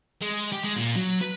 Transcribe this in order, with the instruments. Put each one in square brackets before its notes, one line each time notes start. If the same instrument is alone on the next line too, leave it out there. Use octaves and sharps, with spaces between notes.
[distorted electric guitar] G#3
G4
G#3
A#2
F#3
B4